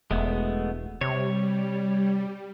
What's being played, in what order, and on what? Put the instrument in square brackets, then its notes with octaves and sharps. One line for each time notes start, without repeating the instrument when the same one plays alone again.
[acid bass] E1 [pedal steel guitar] G#3 A3 B3
[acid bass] C3 [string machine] G3 [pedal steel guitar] C#5